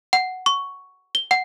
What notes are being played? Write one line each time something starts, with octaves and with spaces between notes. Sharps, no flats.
F#5
C#6
G7
F#5